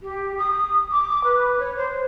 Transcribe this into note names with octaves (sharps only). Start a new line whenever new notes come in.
G4
D#6
D6
B4
C#5
C5